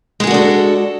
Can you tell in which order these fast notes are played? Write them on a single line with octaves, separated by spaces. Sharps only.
G#3 G#4 F#4 D4 A4